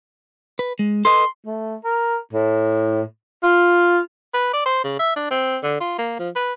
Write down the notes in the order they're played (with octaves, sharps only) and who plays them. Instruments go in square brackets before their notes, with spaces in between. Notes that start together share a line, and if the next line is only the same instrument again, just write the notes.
[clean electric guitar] B4
G#3
[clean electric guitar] A4 B4 D#5 [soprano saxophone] C6
[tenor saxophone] A3
A#4
A2
F4
B4
D5
C5
C#3
E5
D4
C4
D3
F4
A#3
F3
B4